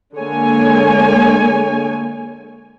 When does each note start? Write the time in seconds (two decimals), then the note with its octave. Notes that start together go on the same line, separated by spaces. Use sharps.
0.17 D3 G#3 A#3 C#5 G#5